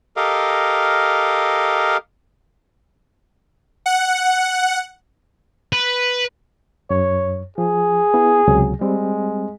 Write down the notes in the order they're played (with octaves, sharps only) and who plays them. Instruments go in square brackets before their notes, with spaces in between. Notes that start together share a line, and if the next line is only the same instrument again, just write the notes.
[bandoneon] G4 A4 A#4 D#5 F5
[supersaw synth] F#5
[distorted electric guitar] B4
[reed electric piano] F#2 [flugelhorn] C#5
[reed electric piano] F3 [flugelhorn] G#4
[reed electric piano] B3 E4
C#2 C3 F#3
[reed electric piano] G3 C4 [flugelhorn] G#3